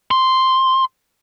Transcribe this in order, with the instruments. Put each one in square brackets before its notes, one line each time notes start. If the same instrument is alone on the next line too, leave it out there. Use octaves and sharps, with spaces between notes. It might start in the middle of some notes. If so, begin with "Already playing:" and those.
[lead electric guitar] C6